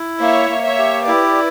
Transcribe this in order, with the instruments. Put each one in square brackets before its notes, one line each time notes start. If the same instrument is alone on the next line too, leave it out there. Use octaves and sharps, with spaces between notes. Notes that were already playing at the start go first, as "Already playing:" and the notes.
Already playing: [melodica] E4
[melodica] A#3 [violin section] C#5 E5
[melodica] A#3
[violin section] C#5 E5
[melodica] G4
[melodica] E4 [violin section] B4 D5